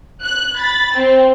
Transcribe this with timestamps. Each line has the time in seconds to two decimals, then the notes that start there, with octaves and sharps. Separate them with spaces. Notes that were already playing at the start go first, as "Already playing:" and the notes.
0.24 F#6
0.58 B5 A6
0.94 C4